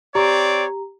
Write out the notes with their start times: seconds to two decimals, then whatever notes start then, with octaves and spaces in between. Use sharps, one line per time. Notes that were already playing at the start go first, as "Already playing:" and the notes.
0.15 C4 G4 C#5 D5 A#5